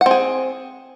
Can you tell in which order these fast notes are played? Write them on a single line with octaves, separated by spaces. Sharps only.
F#5 C4 G#4